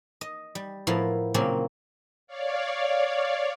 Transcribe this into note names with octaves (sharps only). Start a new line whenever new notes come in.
D#5
G3
A2 F3 B3 E4 A#4 F5
A#2 C#3 F#3 A#3 C4 C#4
C#5 D5 F5